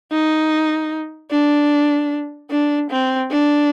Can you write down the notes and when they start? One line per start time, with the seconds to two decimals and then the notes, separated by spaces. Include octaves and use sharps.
0.12 D#4
1.31 D4
2.51 D4
2.90 C4
3.31 D4